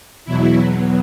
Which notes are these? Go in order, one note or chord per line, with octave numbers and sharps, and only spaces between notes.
E2 B2 F#3 E4